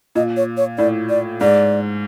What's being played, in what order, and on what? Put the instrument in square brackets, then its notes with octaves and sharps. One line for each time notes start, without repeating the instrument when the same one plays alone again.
[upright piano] A#2 [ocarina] D#5
[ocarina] C#5
C#5
[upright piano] A2 [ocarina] D5
[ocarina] D5
[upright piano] G#2 [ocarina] D5